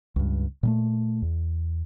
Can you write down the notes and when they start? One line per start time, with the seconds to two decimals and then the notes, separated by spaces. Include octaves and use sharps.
0.16 C#2 G2
0.63 A#2 G3 A3
1.22 E2